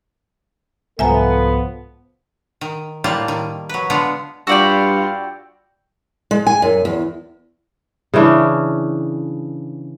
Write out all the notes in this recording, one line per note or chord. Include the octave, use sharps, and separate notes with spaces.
C2 G#2 F3 B3 A4 E5 G#5 A#5
D#3
A2 G3 A#3 F4 A5
D#3
F#3 B4
D3 G#3 B3 F4
G2 F4 F#4 D5 G5 B5 E6
G#3
G#5
F#2
E2
C#3 E3 C#4 D4